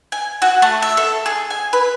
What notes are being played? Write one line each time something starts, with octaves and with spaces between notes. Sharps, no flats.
G#5
F#4
A3
E5
A4
G#4
G#5
B4